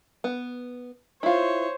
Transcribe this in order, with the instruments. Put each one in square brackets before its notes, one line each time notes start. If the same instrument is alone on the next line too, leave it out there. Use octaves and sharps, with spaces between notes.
[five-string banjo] B3
[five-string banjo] E4 F4 [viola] C5 C#5